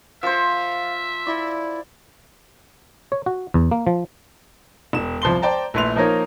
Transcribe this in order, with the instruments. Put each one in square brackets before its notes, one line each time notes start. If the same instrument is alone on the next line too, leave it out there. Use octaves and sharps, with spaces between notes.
[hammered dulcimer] F3 C5 [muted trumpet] E5 [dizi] F5
[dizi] E4 [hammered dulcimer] D5
[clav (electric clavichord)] C#5
F#4
E2
A#3
F3
[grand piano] E1 E7
C2 F3 A5 C6 G7
C5 D5 G5 A5 A#5
A#1 A3 E4 B4 C6 F7
F3 A#3 D#4 A#4 C#5